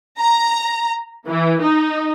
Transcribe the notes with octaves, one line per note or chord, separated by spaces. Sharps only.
A#5
E3
D#4